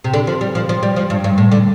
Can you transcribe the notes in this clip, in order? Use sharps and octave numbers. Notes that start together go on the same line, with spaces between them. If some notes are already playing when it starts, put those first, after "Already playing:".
C3
D3
F3
G3
F3
F3
G3
F3
G2
G2
A2
D3